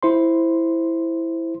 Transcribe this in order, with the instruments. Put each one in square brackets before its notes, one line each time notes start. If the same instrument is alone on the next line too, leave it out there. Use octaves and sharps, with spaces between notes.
[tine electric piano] E4 C5 C6